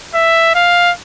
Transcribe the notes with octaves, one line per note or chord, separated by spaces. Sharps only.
E5
F5